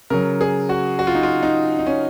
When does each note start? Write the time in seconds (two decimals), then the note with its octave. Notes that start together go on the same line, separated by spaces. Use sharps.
0.10 C#3 F#3 A#4
0.41 G#4
0.69 F#4
0.99 F#4
1.07 F4
1.15 D#4
1.23 F4
1.43 D#4
1.79 D#4
1.87 C#4